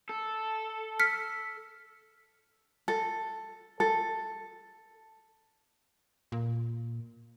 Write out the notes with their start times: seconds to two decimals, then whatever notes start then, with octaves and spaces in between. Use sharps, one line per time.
0.09 A4
0.99 F6 B6 C#7
2.88 A4
3.80 A4
6.32 A#2